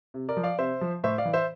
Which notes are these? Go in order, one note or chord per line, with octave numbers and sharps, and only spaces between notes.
C3
A#4 D5
F3
D5 F5
C3 C5 E5
F3
A2 C5 E5
D5 F5
E3
C5 E5